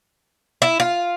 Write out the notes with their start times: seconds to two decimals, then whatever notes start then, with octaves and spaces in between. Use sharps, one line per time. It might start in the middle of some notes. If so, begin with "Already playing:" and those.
0.62 E4
0.80 F4